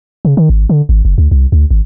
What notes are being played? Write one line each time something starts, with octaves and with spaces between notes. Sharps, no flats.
C#3
D#3
G#1
D3
G#1
F#1
D2
C2
D2
G#1